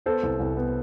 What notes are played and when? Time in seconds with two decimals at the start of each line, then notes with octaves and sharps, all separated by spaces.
0.06 B3 A4 C5
0.23 C2
0.40 C2
0.57 B3